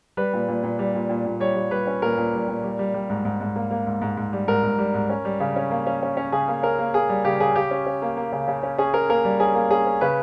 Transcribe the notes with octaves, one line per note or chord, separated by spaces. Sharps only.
G3 B4
A#2
A#2
A#2
G3
A#2
A#2
A#2
G3 C#5
G3
G3 B4
C#4
A#2 A#4
A#2
G3
A#2
G3
G3
G3
G#2
G#2
G#2
A#3
A#3
G#2
G#2
G#2
G3
G#2 A#4
G#2
G3
G#2
C#4
G3
C#3
C#4
A#3
C#4
C#4
C#4
C#3 G#4
A#3
C#4 A#4
A#3
A#3 G#4
G3
C#3 G4
C#3 G#4
C#3 G4
C#4
C#4
A#3
A#3
C#3
C#3
C#4
C#4 G#4
C#4 A#4
A#3 A#4
G3
C#4 G#4
A#3
C#4 G#4
C#4
C#3 B4